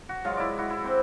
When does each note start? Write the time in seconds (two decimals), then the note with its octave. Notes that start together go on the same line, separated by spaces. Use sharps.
0.09 F#4
0.24 F#3 G#3 F4 F5
0.37 E4 D5
0.58 E4 F#4
0.70 E4
0.84 C4 C5